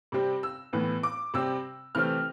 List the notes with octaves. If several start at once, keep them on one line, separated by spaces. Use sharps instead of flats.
C3 G3 C4
E6
A2 E3 B3
D6
C3 G3 C4 E6
C3 E3 A3 C4 F6